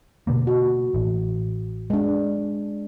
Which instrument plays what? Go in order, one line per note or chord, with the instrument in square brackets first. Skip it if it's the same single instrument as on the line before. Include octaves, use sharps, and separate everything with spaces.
[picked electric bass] B2 D3 A#3
[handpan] F#4
[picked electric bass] A1
[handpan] G#3 D4